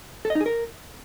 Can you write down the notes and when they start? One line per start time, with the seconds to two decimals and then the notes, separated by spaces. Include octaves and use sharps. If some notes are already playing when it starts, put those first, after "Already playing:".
0.25 A4
0.30 D#5
0.35 D#4
0.41 G#4
0.46 A#4